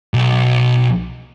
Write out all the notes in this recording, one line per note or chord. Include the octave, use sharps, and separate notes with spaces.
B1